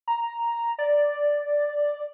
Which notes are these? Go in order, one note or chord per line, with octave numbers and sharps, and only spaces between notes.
A#5
D5